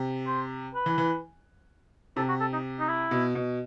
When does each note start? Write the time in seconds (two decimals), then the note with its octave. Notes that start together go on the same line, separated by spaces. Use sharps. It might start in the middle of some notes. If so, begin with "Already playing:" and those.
Already playing: C3
0.27 C5
0.74 B4
0.86 E3
0.98 E3
2.16 C3 A4
2.28 F#4
2.40 A4
2.53 D#4
2.80 D#4
2.88 E4
3.11 B2
3.35 B2